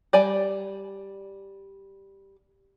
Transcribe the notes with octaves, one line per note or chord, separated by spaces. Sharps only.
G3 D5 G#5